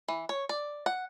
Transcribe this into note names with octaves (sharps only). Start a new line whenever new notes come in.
E3
C#5
D5
F#5